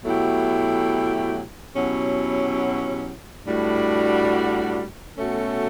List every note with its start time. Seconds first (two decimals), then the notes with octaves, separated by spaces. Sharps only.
0.02 B2 F#3 A3 E4 G4
1.74 B2 F#3 C#4 E4 G4
3.46 A2 G3 D4 F#4
5.17 B2 A3 C#4 F#4 A4